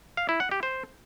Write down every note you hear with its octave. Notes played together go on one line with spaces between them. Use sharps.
F5
E4
F#5
G4
C5